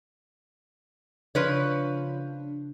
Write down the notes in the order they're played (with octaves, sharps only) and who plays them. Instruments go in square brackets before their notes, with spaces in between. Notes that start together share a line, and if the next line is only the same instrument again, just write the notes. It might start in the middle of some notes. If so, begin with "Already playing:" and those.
[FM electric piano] C#3 D4 [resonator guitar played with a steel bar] F3 B4 C#5